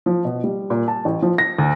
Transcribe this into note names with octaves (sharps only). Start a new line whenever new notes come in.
F3
B2
G3
A#2
A5
A1
F3
A#6
D2